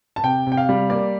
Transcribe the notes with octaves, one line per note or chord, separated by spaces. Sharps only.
A5
C3 G5
C3
G5
F5
G3
A#3 D5